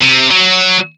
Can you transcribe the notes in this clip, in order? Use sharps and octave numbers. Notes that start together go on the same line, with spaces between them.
C3
F#3